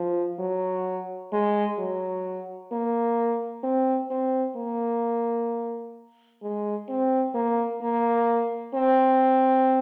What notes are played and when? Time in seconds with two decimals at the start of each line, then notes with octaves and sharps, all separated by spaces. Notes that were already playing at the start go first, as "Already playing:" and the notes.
Already playing: F3
0.39 F#3
1.33 G#3
1.78 F#3
2.72 A#3
3.63 C4
4.10 C4
4.56 A#3
6.43 G#3
6.89 C4
7.35 A#3
7.81 A#3
8.74 C4